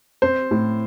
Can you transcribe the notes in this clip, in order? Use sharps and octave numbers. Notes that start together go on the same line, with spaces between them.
C4 C5
A2